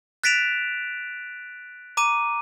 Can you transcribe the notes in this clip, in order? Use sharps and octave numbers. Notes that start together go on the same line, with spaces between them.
F#6 A6 B6 D7 E7 F7
A#5 D6 D#7